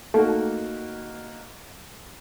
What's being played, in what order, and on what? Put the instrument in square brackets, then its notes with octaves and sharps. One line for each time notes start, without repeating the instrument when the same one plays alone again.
[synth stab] A3 [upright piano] A#3 D#4 F#4